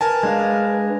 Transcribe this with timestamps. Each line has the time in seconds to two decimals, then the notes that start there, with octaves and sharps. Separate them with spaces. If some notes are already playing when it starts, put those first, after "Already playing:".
0.01 A#4 B4 G#5 A5
0.23 G#3 D4 F5